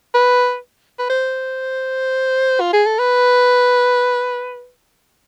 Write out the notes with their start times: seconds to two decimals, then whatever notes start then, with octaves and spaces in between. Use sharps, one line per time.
0.14 B4
0.99 B4
1.09 C5
2.60 F4
2.73 G#4
2.86 A4
2.99 B4